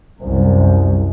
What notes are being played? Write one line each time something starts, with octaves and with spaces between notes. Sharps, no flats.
C2 F#2